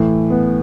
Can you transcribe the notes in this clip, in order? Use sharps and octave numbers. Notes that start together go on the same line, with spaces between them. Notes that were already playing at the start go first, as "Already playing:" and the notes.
Already playing: A2 E3
B3